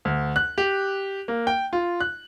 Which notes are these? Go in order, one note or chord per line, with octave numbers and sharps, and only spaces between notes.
D2
F#6
G4
A#3
G5
F4
F#6